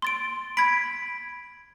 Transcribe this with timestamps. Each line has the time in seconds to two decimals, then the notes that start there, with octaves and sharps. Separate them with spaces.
0.02 C6 A6 D7
0.57 B5 G#6 B6 D7